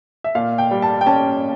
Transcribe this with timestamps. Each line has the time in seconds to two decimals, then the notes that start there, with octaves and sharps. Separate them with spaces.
0.24 E5
0.35 A#2 F5
0.58 G5
0.71 G3
0.82 A5
1.01 G5
1.06 C#4 A5